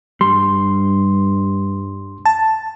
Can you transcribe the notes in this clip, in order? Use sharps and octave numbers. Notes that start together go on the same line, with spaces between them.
G2 G3 C6
A5